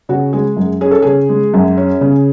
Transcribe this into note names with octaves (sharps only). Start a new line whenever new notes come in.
C#3 F#4
G#3 G#4
F#2
C#4 G#4
A4
C#3 G#4
G#3
F#2
C#4
C#3